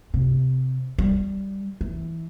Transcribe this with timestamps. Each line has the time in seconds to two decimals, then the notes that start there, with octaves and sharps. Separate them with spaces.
0.14 C3
0.99 G3
1.81 E3